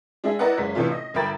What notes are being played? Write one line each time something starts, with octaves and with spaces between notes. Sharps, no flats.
G#3 D4 G#4 E5
E4 A#4 B4 D5 D#5 F#5
F#1 G#3 B6
A2 C3 E3 A3 D4 F4
D#5
G1 A#4 E5 G5 B5 A6